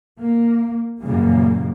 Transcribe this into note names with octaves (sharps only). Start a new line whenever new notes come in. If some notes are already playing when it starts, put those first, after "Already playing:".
A#3
F#2 A#2 C#3 E3 G3 A#3